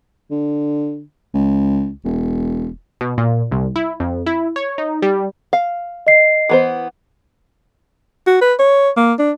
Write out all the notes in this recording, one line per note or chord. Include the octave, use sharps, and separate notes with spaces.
D3
C#2
E1
B2
A#2
C2
E4
F2
E4
C#5
D#4
G3
F5
D#5 C7
E3 B3 C5
F#4
B4
C#5
A#3
D4